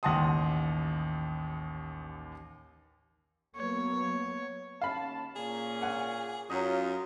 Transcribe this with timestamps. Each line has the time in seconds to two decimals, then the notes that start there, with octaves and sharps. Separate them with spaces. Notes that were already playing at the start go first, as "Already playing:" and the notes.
0.03 A1 D#2 F#5 A5 C6 D#6
3.55 F#3 A#3 B3 C#5
4.81 D#2 C#4 F5 A5 B5
5.36 A#2 C#4 G#4
5.82 F#5 G#5
6.50 F#2 F#3 F4 D#5